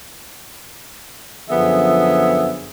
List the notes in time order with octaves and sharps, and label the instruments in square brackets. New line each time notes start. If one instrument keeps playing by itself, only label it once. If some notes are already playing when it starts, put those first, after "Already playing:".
[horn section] F#2 D3 F3 B3 G#4 E5